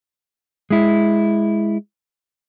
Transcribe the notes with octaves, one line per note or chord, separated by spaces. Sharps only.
G#3 E4